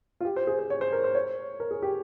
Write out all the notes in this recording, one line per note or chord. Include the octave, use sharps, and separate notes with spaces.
F4
G4
C5
G#4
C5
C#5
C5
A#4
C5
C#5
A#4
G#4
G4